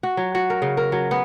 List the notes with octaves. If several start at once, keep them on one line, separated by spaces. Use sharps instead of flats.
F#4
F#3
F#4
A#4
C#3
A#4
F#3
B3